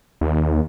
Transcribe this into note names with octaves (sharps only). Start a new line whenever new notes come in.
D#2